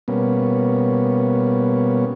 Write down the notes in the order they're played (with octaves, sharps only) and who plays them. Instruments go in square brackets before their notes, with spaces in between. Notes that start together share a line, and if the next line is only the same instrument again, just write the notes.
[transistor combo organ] B2 G3 A#3 B3 C#4